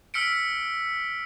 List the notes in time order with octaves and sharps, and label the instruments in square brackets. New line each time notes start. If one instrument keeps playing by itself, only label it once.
[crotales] E6 F6 B6 C#7 D7